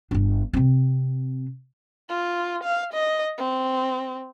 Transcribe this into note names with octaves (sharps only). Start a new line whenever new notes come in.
G1 D4
C3 C4
F4
F5
D#5
C4